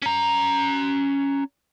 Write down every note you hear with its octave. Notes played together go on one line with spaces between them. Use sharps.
C#4 A#5